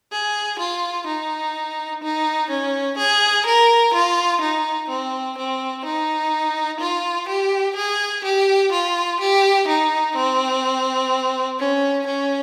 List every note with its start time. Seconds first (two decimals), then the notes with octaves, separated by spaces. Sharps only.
0.12 G#4
0.59 F4
1.07 D#4
2.03 D#4
2.50 C#4
2.98 G#4
3.46 A#4
3.94 F4
4.41 D#4
4.89 C4
5.38 C4
5.85 D#4
6.80 F4
7.28 G4
7.76 G#4
8.24 G4
8.72 F4
9.21 G4
9.68 D#4
10.16 C4
11.59 C#4
12.07 C#4